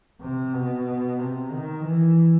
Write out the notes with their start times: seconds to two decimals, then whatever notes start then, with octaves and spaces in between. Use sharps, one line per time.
0.21 C3
0.54 B2
1.19 C3
1.52 D#3
1.85 E3